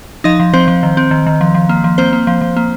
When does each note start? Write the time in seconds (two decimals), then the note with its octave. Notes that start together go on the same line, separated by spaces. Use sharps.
0.24 F3 D#4 D#5
0.40 F3
0.54 F3 C4 C5
0.68 F3
0.83 D#3
0.97 C4
1.11 D#3
1.27 D#3
1.41 F3
1.55 F3
1.69 A#3
1.84 F3
1.98 A#3 C4 C5
2.13 A#3
2.27 F3
2.41 F3
2.57 A#3